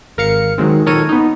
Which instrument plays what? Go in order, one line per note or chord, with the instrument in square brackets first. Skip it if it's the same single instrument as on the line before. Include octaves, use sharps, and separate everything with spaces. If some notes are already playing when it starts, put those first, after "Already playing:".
[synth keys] G#1 A#4 F5 C#7
D#3 F#3 G#3 C4
A#2 D#3 A4 A#4 C#5 D#7
B3 D#4